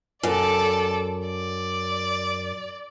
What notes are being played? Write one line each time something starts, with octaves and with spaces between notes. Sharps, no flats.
F#2 A4 D5
D5